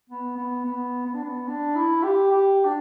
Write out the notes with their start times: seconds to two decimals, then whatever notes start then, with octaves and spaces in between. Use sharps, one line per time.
0.10 B3
0.37 B3
0.65 B3
1.06 B3
1.14 D4
1.23 B3
1.48 D4
1.76 E4
2.03 G4
2.31 G4
2.65 D4